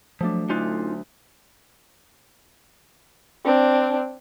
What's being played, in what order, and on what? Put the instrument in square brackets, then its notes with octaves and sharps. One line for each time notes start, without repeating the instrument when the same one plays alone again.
[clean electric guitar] F3 [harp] F#3 A3 D4
[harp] D2 F#6 [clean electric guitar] C#4 D#4 F4
[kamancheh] C4 D4